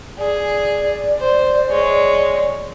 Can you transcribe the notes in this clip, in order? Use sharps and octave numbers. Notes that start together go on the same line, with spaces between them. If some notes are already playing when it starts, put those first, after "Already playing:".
G#4 D5
C5
G#3 C#5